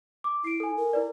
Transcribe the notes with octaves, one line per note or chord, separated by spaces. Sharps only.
D6
E4 C7 D7
A4 G#5
A#4
E4 B4 D5